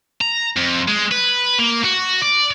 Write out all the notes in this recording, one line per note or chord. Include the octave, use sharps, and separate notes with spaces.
A#5
F2
G#3
B4
A#3
F#4
D5